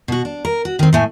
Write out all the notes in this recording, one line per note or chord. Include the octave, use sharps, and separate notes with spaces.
B2 F#4
D4
A#4
F#4
D#3 C4
A2 A3 G#5